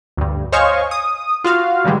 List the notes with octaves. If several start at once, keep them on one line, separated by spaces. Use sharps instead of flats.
D2 G2
C5 C#5 D#5 F5 G#5 C#6
D#6
F4 F#4 F5
G2 D3 E3 G3 G#3